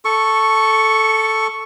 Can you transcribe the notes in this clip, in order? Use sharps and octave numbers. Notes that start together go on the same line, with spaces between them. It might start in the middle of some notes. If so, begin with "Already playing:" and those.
A4 C#6